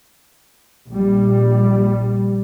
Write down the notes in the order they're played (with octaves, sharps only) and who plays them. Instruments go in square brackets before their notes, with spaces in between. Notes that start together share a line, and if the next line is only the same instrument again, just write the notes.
[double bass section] A#1 G3